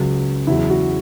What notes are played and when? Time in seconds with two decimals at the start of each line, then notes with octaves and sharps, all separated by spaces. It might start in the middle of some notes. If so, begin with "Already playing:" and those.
Already playing: C#2 C#3 F#3
0.47 E2 C#3 F#3 E4
0.70 F#4